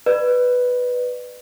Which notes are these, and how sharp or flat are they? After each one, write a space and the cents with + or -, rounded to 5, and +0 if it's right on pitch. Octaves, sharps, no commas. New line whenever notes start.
B4 +0 D5 +35